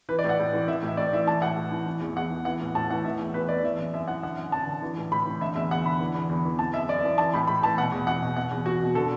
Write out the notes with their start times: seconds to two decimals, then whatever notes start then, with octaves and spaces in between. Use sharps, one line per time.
0.09 E3 B4
0.19 D5
0.24 A2
0.29 F#5
0.39 A2
0.53 E3
0.68 E3 E5
0.83 A2
0.88 E5
0.97 A2 D5
1.13 E3 E5
1.27 E3 A5
1.42 A2 F#5
1.57 A2
1.72 E3
1.86 E3
2.01 E2
2.16 E2 F#5
2.30 E3
2.45 E3 F#5
2.60 A2
2.75 A2 A5
2.91 E3 F#5
3.05 E3 E5
3.19 E2
3.34 E2 B4
3.48 E3 D5
3.63 E3 E5
3.79 F#2
3.94 F#2 E5
4.08 E3 F#5
4.23 D3 F#5
4.38 F#2
4.52 F#2 A5
4.67 D3
4.83 E3
4.97 A2
5.12 A2 B5
5.26 E3
5.41 D3 E5
5.56 E2 E5
5.71 E2 F#5
5.85 D3 B5
6.01 E3
6.15 E2
6.29 E2
6.45 E3
6.59 E3 A5
6.74 F#2 E5
6.88 F#2 D5
7.03 E3
7.18 E3 A5
7.34 A2 B5
7.47 A2 B5
7.63 E3 A5
7.77 B2 F#5
7.92 E2
8.07 E2 F#5
8.22 B2
8.37 B2 F#5
8.51 E2
8.66 E2 F#4
8.80 B2
8.95 D3 A4